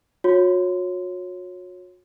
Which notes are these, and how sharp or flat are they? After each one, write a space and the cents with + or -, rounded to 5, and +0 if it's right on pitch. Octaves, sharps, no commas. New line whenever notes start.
F#4 -40 C#5 -10 C6 -25